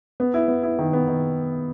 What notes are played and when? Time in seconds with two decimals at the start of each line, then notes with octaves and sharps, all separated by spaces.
0.20 B3
0.34 E4
0.48 B3
0.63 E4
0.79 D#3
0.93 B3
1.08 D#3